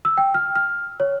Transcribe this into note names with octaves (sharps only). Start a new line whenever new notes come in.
E6
G5
F6
F6
C#5